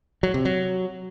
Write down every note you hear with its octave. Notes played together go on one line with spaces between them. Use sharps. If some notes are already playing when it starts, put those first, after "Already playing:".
F#3
C3
F#3